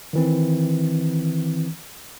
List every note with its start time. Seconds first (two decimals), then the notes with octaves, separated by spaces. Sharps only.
0.13 D#3 E3 C4